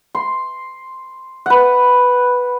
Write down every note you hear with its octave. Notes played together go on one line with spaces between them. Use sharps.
C6
B4 F#5